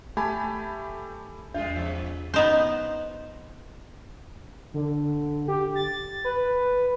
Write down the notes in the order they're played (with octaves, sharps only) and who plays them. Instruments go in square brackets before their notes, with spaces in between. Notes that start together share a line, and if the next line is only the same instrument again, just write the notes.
[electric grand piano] A3 G4 G#5 A5 B5
[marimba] E2 [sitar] G3 G#3 F4
[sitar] B2 F3 G#3
[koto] B3 D#4 C5
[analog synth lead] D3
G4
A6
B4